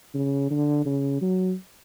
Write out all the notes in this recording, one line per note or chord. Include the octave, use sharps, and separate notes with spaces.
C#3
D3
C#3
F#3